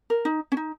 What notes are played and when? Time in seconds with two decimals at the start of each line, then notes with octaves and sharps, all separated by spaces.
0.10 A#4
0.25 D#4
0.52 C#4
0.57 D#4